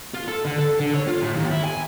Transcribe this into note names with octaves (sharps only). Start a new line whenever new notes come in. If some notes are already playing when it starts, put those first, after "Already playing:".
F4
A4
D3
A4
D3
C#5
F4
A2
D#2
E4
G#5